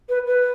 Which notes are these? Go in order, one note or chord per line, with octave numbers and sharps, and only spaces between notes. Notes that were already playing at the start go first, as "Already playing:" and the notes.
B4
B4